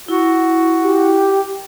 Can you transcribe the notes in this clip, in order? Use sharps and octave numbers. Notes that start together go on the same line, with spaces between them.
E4 F#4
G4